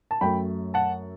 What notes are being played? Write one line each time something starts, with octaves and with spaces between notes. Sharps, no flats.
A5
F#2 F#3 A3 G5 B5
F#5 A5